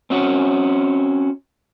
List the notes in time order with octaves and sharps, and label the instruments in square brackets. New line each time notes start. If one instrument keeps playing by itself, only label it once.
[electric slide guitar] C4 C#4 F#4